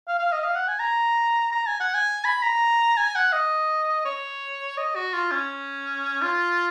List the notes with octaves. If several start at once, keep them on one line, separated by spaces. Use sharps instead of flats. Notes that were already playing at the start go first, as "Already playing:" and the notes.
F5
F5
D#5
F5
F#5
G#5
A#5
A#5
G#5
F#5
G#5
B5
A#5
G#5
F#5
D#5
C#5
D#5
F#4
F4
C#4
F4